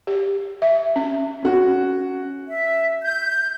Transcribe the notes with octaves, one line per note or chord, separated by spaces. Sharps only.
G4
E5
C#4
C#4 F#4
E5
G6